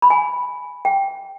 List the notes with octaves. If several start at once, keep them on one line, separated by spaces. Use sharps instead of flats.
B5
G#5
G5